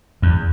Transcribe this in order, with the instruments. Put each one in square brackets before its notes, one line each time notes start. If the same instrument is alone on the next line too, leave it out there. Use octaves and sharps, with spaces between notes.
[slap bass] E2